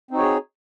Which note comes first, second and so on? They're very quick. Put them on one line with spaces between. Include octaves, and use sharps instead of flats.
C4 D#4 F#4 C#5 G#4